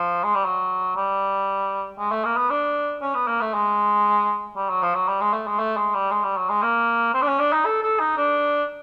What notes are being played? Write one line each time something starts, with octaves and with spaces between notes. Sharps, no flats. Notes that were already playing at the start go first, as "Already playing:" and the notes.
Already playing: F3
G#3
G3
F#3
G3
G#3
A3
A#3
B3
D4
C#4
B3
A#3
A3
G#3
G3
F#3
F3
F#3
G3
G#3
A3
G#3
A3
G#3
G3
G#3
G3
F#3
G#3
A#3
C4
D4
C#4
D4
D#4
A4
A4
D#4
D4